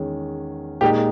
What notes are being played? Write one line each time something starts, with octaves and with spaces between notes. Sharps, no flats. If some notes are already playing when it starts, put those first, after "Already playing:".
Already playing: E2 D#3 G#3 C#4
A#2 G#3 D#4 G4